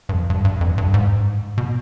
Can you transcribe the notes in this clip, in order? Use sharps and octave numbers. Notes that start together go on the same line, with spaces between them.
G2
F2
G2
G2
F2
G2
G#2
B2